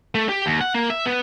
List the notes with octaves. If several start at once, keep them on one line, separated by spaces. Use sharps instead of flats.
A3
G4
D#2
F#5
A#3
E5
B3